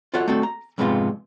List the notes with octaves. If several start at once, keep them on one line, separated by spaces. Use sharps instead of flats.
F4 F#4 A4 C#5 F#5
A3 C4 F#4 A4
A#5
F2 G#2 C3 G#3 B3 F4